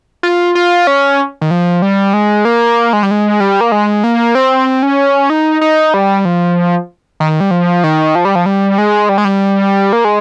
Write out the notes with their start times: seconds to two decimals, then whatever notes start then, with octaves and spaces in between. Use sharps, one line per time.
0.23 F4
0.55 F4
0.87 C#4
1.42 D#3
1.51 F3
1.82 G3
2.13 G#3
2.45 A#3
2.93 G#3
3.03 G3
3.11 G#3
3.40 G3
3.61 A#3
3.72 G#3
4.04 A#3
4.35 C4
4.83 C#4
5.30 D#4
5.61 D#4
5.94 G3
6.25 F3
7.20 D#3
7.40 G3
7.51 F3
7.84 D#3
8.15 F3
8.25 G3
8.35 F3
8.46 G3
8.78 G#3
9.09 G3
9.18 G#3
9.25 G3
9.93 A#3
10.05 G#3